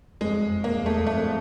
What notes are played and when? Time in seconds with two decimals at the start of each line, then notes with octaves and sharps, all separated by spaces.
0.21 F2 G#3
0.50 F2
0.64 A#3
0.79 E2
0.86 A3
1.07 F2 A3